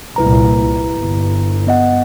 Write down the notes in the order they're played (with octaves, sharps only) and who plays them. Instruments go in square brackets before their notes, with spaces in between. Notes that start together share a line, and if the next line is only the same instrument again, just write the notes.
[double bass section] C2 A#2 [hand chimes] E4 B4 A#5
[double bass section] G1
[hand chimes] B3 D#5 F#5